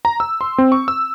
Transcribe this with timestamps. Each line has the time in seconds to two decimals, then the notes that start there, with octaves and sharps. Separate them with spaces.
0.05 A#5
0.20 E6
0.41 C6
0.58 C4
0.72 C#6
0.88 E6